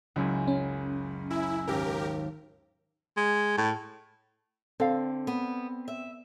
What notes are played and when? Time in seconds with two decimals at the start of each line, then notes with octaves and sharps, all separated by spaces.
0.16 F#1 C#2 F#2 G#5
0.48 C#4
1.30 E4 A#4 G#5 E6
1.67 G#1 D#2 G4 A#4
3.17 G#3
3.57 A2
4.80 D3 C4 A4 F5
5.27 B3
5.88 E5